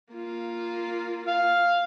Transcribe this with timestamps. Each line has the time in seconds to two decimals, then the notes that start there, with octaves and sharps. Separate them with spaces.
0.14 A#3 F4
1.27 F5